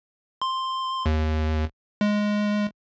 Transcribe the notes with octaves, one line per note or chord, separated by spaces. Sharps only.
C6
D#2
G#3